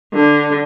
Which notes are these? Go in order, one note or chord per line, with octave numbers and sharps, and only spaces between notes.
D3